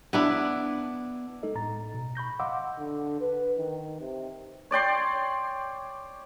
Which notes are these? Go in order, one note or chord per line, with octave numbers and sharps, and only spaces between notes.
B3 D4 E4
G#3 D#4 A4 D#5
A2 A#5 A6
B2
B5 C#6 G6 A#6
D#5 F5 F#5 C6 D6 E6
D3
B4
D#3
C3
C#5 D5 G5 C6